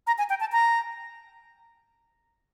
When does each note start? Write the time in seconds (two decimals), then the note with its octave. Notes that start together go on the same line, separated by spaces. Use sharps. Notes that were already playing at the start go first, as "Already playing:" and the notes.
0.07 A#5
0.18 G#5
0.30 G5
0.40 A5
0.52 A#5